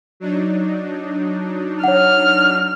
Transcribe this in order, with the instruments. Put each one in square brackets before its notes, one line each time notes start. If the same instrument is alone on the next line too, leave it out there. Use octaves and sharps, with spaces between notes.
[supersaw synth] F#3 D4 D#4
[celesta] C#5 F#5 [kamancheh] F6